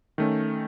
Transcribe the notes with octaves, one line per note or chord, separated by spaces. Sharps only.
D#3 A3 C#4